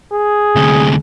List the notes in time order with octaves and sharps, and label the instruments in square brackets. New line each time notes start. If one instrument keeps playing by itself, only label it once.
[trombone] G#4
[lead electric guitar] D2 C3